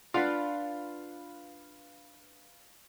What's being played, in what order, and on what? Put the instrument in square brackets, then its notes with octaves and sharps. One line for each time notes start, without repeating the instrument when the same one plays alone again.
[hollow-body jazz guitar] D4 [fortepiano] F4 F#5 [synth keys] B4 F5